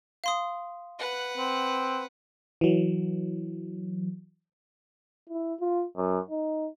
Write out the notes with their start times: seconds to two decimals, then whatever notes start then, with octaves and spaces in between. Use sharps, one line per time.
0.24 F5 C6 D#6
0.99 B4 F#5
1.37 C4
2.61 E3 F#3
5.30 E4
5.60 F4
5.96 F#2
6.30 D#4